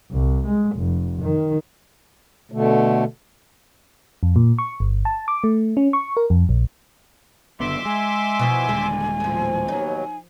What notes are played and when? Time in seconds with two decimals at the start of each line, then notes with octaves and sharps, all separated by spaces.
0.12 C2
0.47 G#3
0.76 F1
1.22 D#3
2.52 B2 D3 A3
4.23 F2
4.36 A#2
4.58 C#6
4.80 G1
5.05 A5
5.28 D6
5.44 A3
5.77 C#4
5.93 C#6
6.17 A#4
6.30 F2
6.49 A#1
7.60 F#1 D3 B3 E5 C6 D6
7.85 G#3 G#5
8.39 B2 E3 F3
8.69 D#1 D3 G#3
9.20 A2 F3
9.68 D#2 B2 F#3 D#4